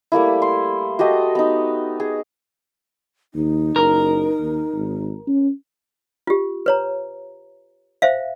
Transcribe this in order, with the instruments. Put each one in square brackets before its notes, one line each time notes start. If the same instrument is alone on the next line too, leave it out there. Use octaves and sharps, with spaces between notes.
[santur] G3 A3 A#3 E4
C6
F#4 G4 A4 D#5
B3 D#4
G#4
[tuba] D#2 [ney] D#4
[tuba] F#1 [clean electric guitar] A#4
[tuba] D#2
G#1
C#4
[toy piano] F4 G4
B4 C#5 A#5
C5 E5 F5